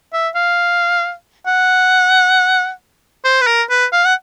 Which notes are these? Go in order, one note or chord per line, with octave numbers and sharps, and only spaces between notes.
E5
F5
F#5
C5
B4
A#4
B4
F5
F#5